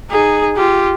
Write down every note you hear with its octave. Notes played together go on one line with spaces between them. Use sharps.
D#4 G#4
F4 G4